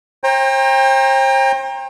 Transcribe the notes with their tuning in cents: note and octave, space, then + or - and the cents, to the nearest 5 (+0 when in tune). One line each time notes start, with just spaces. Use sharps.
C5 +45 G5 +30 A#5 +0